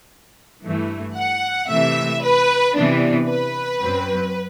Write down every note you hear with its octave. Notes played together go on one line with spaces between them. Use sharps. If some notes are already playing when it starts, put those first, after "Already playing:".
G2 E3 A3
F#5
C3 E3 A3 E5
B4
C3 E3 B3 D4
B4
F#2 F#3 C4